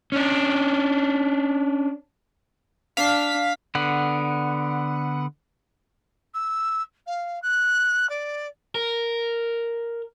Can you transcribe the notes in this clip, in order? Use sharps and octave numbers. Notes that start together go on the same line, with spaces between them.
C#4 D4
D4 F5 B6
D3 B3 F#5
E6
F5
F#6
D5
A#4